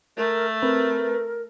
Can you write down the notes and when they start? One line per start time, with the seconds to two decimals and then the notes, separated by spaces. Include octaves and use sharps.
0.17 A3 A#4
0.62 C4 A#4 B4